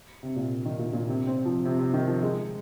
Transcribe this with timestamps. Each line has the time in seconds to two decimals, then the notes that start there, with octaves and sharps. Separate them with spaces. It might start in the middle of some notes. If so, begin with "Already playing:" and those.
0.23 C3
0.36 A#2
0.65 D#3
0.79 A#2
0.93 A#2
1.09 C3
1.27 C4
1.45 F3
1.65 C3
1.79 C3
1.94 D#3
2.07 F3
2.23 G#3